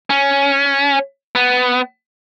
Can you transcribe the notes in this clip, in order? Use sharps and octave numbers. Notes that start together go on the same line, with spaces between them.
C#4
B3